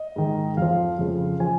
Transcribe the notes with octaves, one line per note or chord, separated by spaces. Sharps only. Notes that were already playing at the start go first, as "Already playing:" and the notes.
Already playing: D#5
G#2 D#3
F2 F3 F5
F2 C#3 F3
F3 G#5